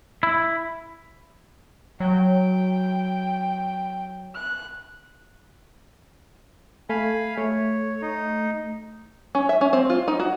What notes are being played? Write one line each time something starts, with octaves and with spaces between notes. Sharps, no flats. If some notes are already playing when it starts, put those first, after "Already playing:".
E4
F#3 G5
F#6
A3 F5 G#5 B5
A3 C#5
D#4
C#4
E5
C#4
C4
F4
D#4
F#4